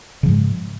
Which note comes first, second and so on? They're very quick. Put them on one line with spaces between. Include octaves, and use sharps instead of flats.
C#3 F3 G#2 G#3